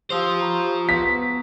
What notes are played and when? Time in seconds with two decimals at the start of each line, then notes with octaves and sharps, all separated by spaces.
0.10 F4 G4 C5 D#6 E6 F7
0.41 A#5 B5 C#6
0.89 B3 B6